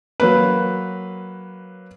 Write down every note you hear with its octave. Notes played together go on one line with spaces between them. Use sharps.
F#3 A#3 B4